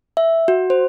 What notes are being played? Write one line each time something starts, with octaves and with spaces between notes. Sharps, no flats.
E5
F#4
C5